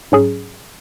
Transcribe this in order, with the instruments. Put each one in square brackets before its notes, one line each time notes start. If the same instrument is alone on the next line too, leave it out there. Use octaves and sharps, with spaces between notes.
[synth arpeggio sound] G#2 F#3 C#4 G#4